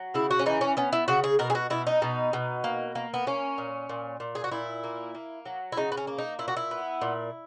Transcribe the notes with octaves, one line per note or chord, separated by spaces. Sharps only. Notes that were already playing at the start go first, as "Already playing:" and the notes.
Already playing: F#3
C#3 E4
F#4
C#4
E3 D#4
C#4
B3 C#4
E4
C#3 F#4
G#4
B2 A#4
G#4
F#4
B2 E4
D#4
B2
B2
A#3
A#3
B3
A#3 C#4
A#2
A#2
A#2
G#4
F#4
A#2 E4
A#3
A#3
F#3
E4
C#3 D#4
B3
C#4
A#3
D#4
A#2 E4
F#4
E4
B3
A#2